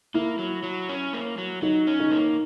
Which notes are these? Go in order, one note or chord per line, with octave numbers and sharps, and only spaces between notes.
A#3 E4
F#3
F#3
C#4
A#3
F#3
F#3 D#4
C#4
D#4
A#3